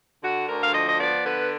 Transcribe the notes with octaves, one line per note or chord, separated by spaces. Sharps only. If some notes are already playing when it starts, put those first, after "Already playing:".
D3 F#4
D2 A#4
F5
F3 D#5
D#5
B3 D5
D3 B4